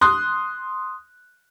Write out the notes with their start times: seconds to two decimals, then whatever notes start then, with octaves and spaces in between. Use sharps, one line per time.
0.01 C6 D#6 F#6